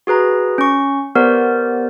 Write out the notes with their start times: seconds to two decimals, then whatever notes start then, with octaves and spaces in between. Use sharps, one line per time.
0.07 F#4 G#4 B4 A#5
0.58 C#4 C#6
1.15 B3 G4 A#4 C5 D5